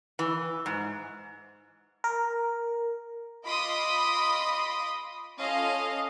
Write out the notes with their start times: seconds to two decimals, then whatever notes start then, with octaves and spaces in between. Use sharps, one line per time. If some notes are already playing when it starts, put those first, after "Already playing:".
0.19 E3
0.66 G#2
2.04 A#4
3.46 F4 D#5 B5 C6 D6 D#6
5.38 C#4 F4 A4 D#5 F5